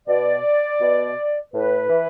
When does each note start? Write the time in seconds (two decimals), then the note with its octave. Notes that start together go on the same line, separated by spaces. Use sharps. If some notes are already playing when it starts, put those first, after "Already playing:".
0.07 B2 D5
0.80 B2
1.54 A2 B4
1.90 E3